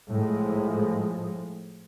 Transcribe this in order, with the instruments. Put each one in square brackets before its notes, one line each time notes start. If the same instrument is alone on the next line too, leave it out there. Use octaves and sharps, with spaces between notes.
[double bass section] A2 F3 G#3